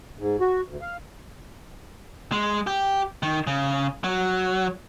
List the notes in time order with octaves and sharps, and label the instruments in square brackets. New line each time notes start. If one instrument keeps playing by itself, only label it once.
[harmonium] G#2
F#4
D2
F5
[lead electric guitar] G#3
G4
D#3
C#3
F#3